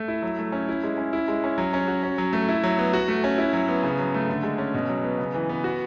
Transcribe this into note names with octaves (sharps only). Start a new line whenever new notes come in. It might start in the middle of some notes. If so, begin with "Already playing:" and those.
Already playing: A3
E4
F#3
A3
C#4
E4
G#3
C#4
E4
G#3
C#4
F#3
C#4
F#4
C#4
F#3
A3
E4
F#3
B3
F#4
A3
C#4
E4
F#3
B3
C#3
F#3
A3
D3
G#3
C#4
B2
F#3
B3
C#3
E3
B3
F#4